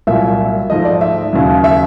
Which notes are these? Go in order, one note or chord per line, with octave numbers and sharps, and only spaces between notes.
C2 A#2 F#3 E5
G#2 F3 A3 D#5
D5
E5
D#2 C#3 F#3
E5